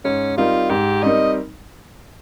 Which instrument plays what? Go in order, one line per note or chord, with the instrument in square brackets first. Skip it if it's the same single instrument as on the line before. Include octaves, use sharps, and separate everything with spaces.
[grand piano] G#2 [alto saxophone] C#4
[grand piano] G3 C4 D#4 A#4 [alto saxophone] F4
[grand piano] G#2 [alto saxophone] G4
[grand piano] G3 C4 D#4 A#4 [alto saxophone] D#5